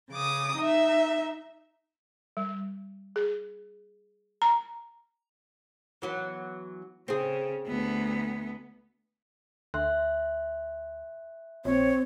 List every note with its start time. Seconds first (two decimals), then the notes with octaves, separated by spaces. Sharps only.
0.11 C#3 D6 D#6
0.57 D#4 E5
2.37 G3
3.16 G#4
4.42 A#5
6.02 E3 F#3 B3
7.08 C#3 C4 G#4
7.67 D2 B3
9.74 D2 E5 C6 F#6
11.65 A#1 C4 C#5